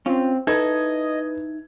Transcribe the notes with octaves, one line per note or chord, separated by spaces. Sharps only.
C4 C#4 F4
D#4 E4 A4 B4 D#5 G#6